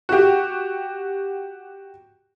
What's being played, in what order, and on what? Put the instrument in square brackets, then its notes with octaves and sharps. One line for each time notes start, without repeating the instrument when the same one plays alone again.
[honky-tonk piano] F#4 G4